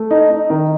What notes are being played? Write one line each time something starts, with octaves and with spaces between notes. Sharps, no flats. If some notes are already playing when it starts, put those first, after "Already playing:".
Already playing: A3
D#4
D#4
D#3